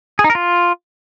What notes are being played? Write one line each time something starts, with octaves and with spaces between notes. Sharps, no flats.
G#4
D#4
A#4
F4